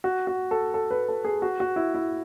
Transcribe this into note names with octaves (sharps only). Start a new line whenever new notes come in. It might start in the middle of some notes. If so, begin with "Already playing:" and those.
F#4
F#4
A4
A4
B4
A4
G#4
F#4
F#4
E4
E4